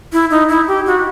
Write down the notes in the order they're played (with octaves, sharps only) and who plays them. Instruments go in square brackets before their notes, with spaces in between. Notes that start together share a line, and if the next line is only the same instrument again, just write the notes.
[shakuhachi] E4
D#4
E4
G4
F#4